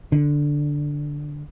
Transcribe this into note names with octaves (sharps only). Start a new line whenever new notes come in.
D3